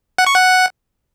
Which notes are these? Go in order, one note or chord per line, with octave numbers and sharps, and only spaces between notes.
F#5
C#6
F#5